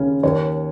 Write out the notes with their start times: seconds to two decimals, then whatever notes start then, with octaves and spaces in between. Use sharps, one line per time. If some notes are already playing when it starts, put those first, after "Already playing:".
Already playing: D#2 C#3 C#4
0.23 D#2 C#5